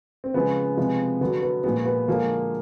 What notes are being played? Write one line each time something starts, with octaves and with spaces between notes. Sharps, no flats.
C4
C#3 F3 G#3 B3
C3 F3 G#3
D3 F#3 B3
B3
A#2 F3 G#3 B3
B3
D3 F3 G#3 A#3